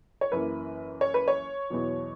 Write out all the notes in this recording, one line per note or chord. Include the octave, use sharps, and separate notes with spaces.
C#5
F#2 E3 A#3 B4
C#5
B4
C#5
E2 B2 F#3